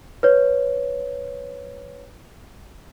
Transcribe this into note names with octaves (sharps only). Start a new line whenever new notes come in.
B4 C#5